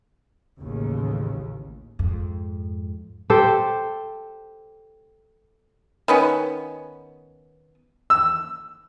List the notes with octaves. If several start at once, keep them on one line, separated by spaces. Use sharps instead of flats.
A1 D#2 C#3
F2 G#2
G4 A4 C5
D#3 B3 C#4
E6